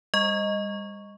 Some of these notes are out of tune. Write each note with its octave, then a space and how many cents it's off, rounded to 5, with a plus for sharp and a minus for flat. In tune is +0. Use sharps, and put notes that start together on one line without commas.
G3 +40 D#5 +0 C#6 +0